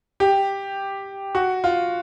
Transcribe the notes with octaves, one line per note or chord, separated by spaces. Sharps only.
G4
F#4
F4